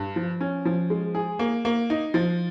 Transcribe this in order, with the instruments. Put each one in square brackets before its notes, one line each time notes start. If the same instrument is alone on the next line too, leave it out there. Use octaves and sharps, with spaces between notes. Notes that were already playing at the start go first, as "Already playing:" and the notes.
Already playing: [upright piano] G2
F3
C#4
F3
G#3
G#4
A#3
A#3
D#4
F3